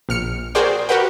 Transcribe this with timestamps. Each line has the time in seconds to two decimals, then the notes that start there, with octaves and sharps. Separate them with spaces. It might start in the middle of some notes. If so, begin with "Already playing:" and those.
0.09 A#1 F6 C#7
0.55 F#4 G#4 A#4 C5 D5 G5
0.89 F#4 G4 A#4 B4 F#5 G5